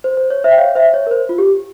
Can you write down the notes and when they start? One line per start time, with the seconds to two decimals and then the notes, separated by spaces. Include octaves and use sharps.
0.04 C5
0.17 C5
0.30 C#5
0.44 C5 E5
0.51 G5
0.58 C#5 F5
0.75 C5 E5
0.94 C#5
1.07 A#4
1.11 C5
1.29 F4
1.38 G4